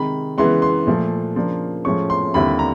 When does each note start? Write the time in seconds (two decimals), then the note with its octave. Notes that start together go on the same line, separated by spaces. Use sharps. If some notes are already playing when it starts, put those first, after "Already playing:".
Already playing: C3 D#3 G#3 B5
0.38 C#3 E3 G#3 B3 C6
0.62 C6
0.87 A#2 F3 A3
1.36 C#3 F3 A#3 D4
1.85 A2 F3 G#3 C#4 C#6
2.10 C6
2.34 D#2 D3 G3 C4 E4 B5
2.59 A#5